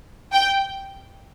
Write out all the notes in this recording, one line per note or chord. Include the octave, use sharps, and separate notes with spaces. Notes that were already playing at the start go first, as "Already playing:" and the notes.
G5